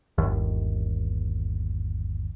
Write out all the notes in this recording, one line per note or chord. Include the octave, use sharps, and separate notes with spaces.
G1 D#2